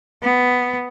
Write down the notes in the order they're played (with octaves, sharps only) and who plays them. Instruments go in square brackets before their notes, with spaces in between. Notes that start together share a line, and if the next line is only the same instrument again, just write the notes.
[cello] B3